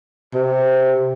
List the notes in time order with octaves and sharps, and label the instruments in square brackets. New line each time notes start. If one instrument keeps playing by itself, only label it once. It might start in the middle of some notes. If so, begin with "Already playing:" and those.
[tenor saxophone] C3